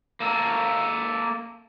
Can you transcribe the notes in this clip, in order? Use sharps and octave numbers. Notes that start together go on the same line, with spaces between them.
A#3 A4